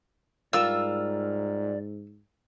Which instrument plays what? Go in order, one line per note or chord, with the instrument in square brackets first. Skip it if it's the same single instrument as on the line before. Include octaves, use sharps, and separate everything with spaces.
[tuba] G#2 [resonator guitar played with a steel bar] G3 F4 A#4 [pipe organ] D5 [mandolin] E6